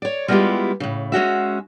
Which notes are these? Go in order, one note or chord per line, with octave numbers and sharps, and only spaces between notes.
C#5 D5
G3 G#3 B3 E4 F4 G4
A2 C#3
G#3 C#4 F#4 E5